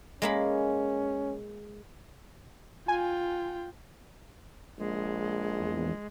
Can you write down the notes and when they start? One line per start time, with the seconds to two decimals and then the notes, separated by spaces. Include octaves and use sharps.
0.22 G#3 A#3 C#4 B5
2.88 F4 G5 G#5
4.78 A#1 G#3
5.59 E2